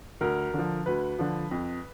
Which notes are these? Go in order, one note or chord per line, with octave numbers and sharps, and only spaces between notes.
D2 A#4
D3 F3
D2 B4
D3 F3
F2